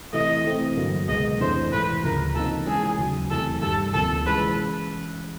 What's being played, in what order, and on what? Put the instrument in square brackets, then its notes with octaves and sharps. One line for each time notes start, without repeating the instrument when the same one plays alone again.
[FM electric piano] C3 E3 A3 [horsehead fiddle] D#5
[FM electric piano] E3 A3 C4
G2 D3 F#3 A#3
[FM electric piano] C#2 B2 G#3 B3 [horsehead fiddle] D#5
[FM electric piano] F2 C3 E3 A3 D4 [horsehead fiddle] C5
[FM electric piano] G#2 E3 A3 [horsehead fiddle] B4
[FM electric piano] D2 C#3 F3 [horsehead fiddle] A#4
[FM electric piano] C3 F3 A#3 D#4 [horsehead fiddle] A4
[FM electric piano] E3 G#3 C#4 [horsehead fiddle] G#4
[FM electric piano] D#2 C#3 F#3
[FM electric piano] E2 C3 E3 A3 [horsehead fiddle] A4
[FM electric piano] G2 D#3 G3 [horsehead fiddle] A4
[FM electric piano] D2 C3 F3 A#3 [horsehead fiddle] A4
[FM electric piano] E3 G#3 C#4 [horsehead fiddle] B4